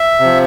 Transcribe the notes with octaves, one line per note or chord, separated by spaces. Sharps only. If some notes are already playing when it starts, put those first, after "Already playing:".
Already playing: E5
C3 F3